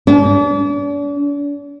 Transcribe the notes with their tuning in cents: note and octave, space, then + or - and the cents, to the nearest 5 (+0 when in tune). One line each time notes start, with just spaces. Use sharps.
D4 -40